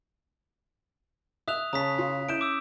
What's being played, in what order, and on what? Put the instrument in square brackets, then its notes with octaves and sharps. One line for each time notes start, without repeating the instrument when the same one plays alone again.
[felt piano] E5 [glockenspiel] D#6 F#6 F7
[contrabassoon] C#3 [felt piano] C#4 A5 [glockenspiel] A#5 D#6 B6
[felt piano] F4
[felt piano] C#4 E4 G6 [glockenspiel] D7 E7
[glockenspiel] D6 E6